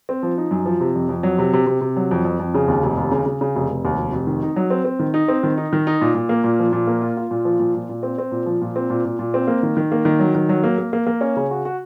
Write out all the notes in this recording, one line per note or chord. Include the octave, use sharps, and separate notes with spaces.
C4
F3
D#4
F#2
F3
C3
F2
F2
F#3
C3
C3
C3
C3
F#3
F2
F2
F2
C#3
D#2
F1
D#2
C#3
C#3
C#3
F1
F1
D#2
F1
F1
D#3
D#4
F#3
C4
C4
D#3
D#4
C4
D#3
D#4
D#3
D#4
A#2
A#2
A#3
A#2
F3
A#2
A#3
F4
F4
A#2
F3
A#2
A#2
A#2
C4
C4
A#2
F3
A#2
C4
A#2
A#2
A#2
C4
A#3
D#3
D#3
A#3
D#3
F#3
D#3
F#3
A#3
A#3
A#3
A#3
C#4
C#3
F#4
F#4